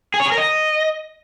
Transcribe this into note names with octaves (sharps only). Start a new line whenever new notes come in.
G#4
C#5
G#4
A#4
D#5